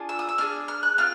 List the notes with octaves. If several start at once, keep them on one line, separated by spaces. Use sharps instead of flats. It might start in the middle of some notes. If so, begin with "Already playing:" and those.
Already playing: D4 F4 G#4
E6
D#6
E6
D4 F4 G#4 F6
F6
F#6
C4 F4 F6